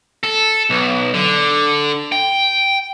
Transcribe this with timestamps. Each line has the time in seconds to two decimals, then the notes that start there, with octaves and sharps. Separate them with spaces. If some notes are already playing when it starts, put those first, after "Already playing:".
0.23 A4
0.70 B1
1.14 D3
2.12 G5